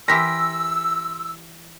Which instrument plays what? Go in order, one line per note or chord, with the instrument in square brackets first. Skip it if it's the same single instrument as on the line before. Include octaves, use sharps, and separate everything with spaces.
[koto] E3 G4 A#4 [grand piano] C6 A#6 B6 [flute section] E6